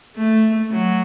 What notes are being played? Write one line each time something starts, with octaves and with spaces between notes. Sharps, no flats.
A3
F#3